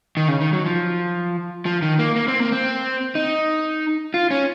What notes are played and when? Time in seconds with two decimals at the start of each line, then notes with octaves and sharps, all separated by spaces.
0.17 D#3
0.28 C#3
0.41 D#3
0.53 F#3
0.66 F3
1.66 F3
1.82 D#3
1.99 A#3
2.16 A#3
2.28 C4
2.40 A#3
2.52 C4
3.15 D#4
4.14 F4
4.31 C#4